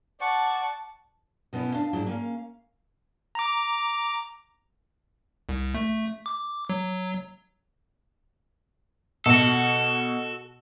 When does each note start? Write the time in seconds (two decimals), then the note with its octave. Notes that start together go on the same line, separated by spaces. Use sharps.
0.21 D5 F#5 A5 C#6
1.53 B2 B3 C#4 E4
1.74 D4 F5 A5
1.93 G#2 F#3 D4 E4 A5
2.06 A#3 C#4 F5
3.35 A#5 D6
5.49 C2
5.75 A3
6.26 D6
6.70 F#3
9.26 B2 F#4 A4